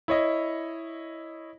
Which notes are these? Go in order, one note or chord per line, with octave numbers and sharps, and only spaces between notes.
E4 C#5 D#5